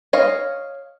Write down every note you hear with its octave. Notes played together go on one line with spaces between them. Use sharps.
C#5 D#5 F5